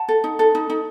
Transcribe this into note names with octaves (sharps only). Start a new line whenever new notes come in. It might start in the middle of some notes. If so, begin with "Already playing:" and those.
Already playing: F#5 A5
A4
D#4
A4
D#4
D#4